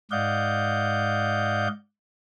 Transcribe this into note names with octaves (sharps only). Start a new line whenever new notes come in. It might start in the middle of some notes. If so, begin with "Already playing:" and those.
G#2 D5 D#5 F5 F#5 G6